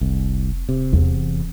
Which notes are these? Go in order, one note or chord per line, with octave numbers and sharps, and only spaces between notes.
F1 C2
D1 C3
E2